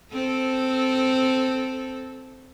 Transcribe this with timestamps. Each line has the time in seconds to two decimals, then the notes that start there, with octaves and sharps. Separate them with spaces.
0.13 C4 A4